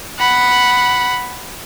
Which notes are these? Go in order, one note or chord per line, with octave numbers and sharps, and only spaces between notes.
F#5 B5